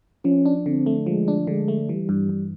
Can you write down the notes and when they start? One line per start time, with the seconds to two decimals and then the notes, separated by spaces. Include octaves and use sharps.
0.25 F3 C#4
0.46 D4
0.66 D3 C4
0.86 A3
1.07 F3 G#3
1.28 D4
1.47 D3 G#3
1.68 A3
1.89 E3 G3
2.09 G2
2.29 G2